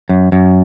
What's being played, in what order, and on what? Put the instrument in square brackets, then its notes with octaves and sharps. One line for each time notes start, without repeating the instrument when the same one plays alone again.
[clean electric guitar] F#2
F#2